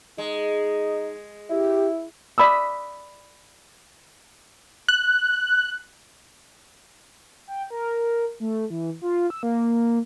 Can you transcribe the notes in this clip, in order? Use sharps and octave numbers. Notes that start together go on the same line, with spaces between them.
G#3 D#4
E4 G4
D5 B5 D#6 E6
F#6
G5
A#4
A3
E3
F4
E6
A#3